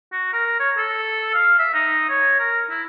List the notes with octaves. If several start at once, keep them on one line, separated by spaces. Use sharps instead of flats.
F#4
A#4
C#5
A4
F5
E5
D#4
C#5
A#4
E4